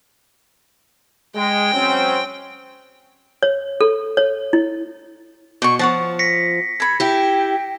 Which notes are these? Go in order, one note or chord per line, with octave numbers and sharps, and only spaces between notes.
G#3 G5
F#3 C4 C#4
C#5
A4
C#5
E4
B2 D5 C#6
F3 C#5 F#5 A5
A#6 B6 C#7
A4 B5 G#6
E4 G4 G5